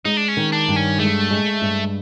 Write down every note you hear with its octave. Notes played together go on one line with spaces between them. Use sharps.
G#3 D#4
D4
C#4
D#3
D4
G2
C#4
G#3 A3
G#3
G2